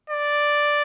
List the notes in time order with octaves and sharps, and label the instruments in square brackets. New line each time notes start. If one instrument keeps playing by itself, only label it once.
[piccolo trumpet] D5